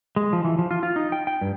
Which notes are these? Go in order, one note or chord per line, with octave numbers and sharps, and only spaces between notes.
G#3
F3
E3
F3
F4
F4
D#4
G5
G5
G2